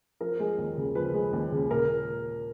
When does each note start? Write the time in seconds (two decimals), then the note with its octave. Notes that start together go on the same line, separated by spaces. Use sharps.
0.20 F3 A#4
0.39 G#3
0.58 D#2
0.77 C#3
0.95 F3 B4
1.14 G#3
1.33 D#2
1.51 C#3
1.70 A#2 A#4